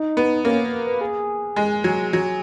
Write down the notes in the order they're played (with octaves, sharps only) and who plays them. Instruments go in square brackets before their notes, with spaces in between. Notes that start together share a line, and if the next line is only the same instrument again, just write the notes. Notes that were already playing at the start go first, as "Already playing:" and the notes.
Already playing: [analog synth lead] D#4
[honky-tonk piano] B3
[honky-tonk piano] A#3 [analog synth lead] C#4
[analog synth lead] B4
G#4
[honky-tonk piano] G#3
F#3
F#3